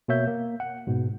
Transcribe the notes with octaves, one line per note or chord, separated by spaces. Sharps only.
B2 A#3 C#5 E5 G6
A#3
F#5
G#2 B2